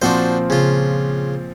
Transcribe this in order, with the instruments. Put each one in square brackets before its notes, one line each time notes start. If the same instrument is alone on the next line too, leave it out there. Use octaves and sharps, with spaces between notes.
[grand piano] A#2 F3 C4 [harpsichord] D4 F#4 C5
[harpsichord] C#3 F4